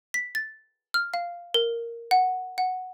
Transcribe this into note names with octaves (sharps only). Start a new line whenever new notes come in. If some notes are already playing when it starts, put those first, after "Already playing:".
B6
A6
F6
F5
A#4
F#5
F#5